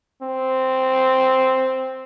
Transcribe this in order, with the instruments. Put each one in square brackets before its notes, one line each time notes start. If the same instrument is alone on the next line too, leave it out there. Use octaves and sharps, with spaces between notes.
[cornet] C4